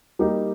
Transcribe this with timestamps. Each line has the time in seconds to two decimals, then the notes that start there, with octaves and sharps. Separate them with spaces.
0.19 G3 A#3 D#4 G4